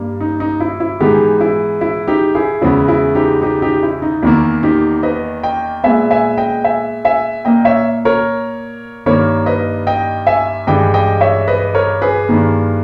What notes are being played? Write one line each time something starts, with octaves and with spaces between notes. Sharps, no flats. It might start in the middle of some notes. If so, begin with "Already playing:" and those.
Already playing: G2 G3 A#3
D#4
D#4
E4
E4
G#2 E3 G#3 B3 D#4 G4
E4
E4
D#4 G4
E4 G#4
E2 C#3 G#3 B3 E4
E4
D#4 G4
D#4 G4
D#4 G4
E4
D#4
E2 D#3 A#3 E4
D#4 G4
B4 D#5
D#5 G5
A#2 G#3 B3 E5 G#5
E5 G#5
D#5 G5
E5 G#5
E5 G#5
A#2 A#3 D#5 G5
C#5 E5
A#4 C#5
G2 D#3 G3 A#3 A#4 C#5
B4 D#5
D#5 G5
E5 G#5
G2 E3 G#3 D#5 G5
D#5 G5
C#5 E5
B4 D#5
A#4 C#5
G#4 B4
G2 D#3 A#3